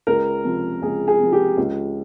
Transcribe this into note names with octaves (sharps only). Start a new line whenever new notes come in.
C#2 A#4
C3 F3
C#2 G#4
G#4
C3 F3
G4
C#2